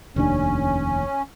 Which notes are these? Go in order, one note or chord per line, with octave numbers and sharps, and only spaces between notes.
F1 D#2 C#4 D4